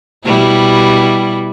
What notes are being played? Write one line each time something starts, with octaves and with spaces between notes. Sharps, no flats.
B2 G3 E4